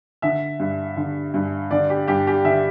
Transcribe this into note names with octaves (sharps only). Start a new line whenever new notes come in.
D3 E5
G2
D3
G2
D3 D5
G4
G2 G4
G4
D3 E5